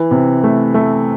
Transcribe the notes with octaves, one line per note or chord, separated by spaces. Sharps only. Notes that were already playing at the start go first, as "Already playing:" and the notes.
Already playing: E3
C3
A3
A3